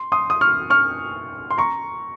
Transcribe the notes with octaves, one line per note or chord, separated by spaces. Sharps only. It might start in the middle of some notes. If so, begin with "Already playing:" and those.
Already playing: C6
C6 D#6
D#6
C#6 F6
C#6 F6
C6
A#5 C#6